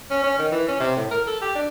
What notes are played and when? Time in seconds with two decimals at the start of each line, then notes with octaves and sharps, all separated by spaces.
0.11 C#4
0.23 C#4
0.39 D#3
0.52 E3
0.68 C#4
0.80 C3
0.97 A2
1.11 A#4
1.27 A4
1.42 G4
1.55 D4